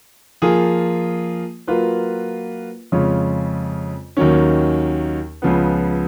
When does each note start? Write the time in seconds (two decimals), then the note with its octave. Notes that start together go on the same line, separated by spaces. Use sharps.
0.42 F3 A#3 F4 G#4
1.67 F#3 A#3 F4 B4
2.92 F2 C#3 G#3 C#4 F4
4.17 D#2 D#3 F#3 C#4
5.42 C#2 C#3 F3 B3